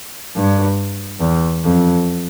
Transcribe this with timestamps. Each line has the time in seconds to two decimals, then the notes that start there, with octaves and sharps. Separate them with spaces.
0.36 G2
1.21 E2
1.64 F2